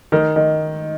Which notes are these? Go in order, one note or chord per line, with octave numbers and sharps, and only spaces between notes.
D#3
D#3